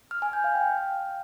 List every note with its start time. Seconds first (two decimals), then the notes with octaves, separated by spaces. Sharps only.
0.11 F6
0.22 G#5
0.33 G6
0.44 F5
0.55 G5